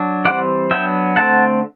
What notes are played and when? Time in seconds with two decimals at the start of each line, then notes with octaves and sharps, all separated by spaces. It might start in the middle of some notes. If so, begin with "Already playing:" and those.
Already playing: F#3 D4
0.25 E3 G3 C4 D5 F#5
0.71 F#3 B3 D4 E5 G5
1.16 D3 A3 C4 F#5 A5